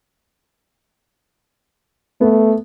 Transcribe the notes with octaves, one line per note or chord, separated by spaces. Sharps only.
A3 B3